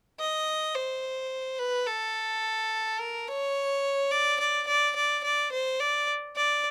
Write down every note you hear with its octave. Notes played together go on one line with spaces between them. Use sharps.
D#5
C5
B4
A4
A#4
C#5
D5
D5
D5
D5
D5
C5
D5
D5